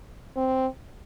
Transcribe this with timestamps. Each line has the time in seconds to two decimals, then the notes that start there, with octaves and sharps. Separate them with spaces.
0.36 C4